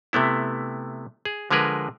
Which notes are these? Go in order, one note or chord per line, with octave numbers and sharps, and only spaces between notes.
C3 A3 B3 E4
G#4
D3 F3 G#3 G#4 A#4 B4